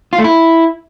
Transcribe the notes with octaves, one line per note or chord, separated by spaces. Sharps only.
F4
A3
E4